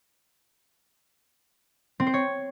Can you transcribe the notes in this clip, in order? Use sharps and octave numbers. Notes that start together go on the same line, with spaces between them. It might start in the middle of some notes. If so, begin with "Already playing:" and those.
C4
C5
C#5